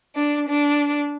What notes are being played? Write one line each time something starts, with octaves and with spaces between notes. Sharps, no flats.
D4
D4